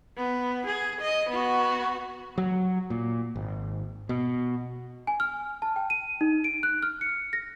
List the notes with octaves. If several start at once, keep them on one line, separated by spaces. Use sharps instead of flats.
B3
G#4
D#5
B3 F#4
F#3
A#2
G#1
B2
G#5
F6
A5
G5
D#7
D#4
D7
F#6
F6
C#7
A#6